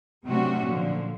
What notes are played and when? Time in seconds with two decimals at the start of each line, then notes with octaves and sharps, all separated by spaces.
0.25 C3 F#3 A3 C#4 D4 F#4
0.64 A#2 D3 F3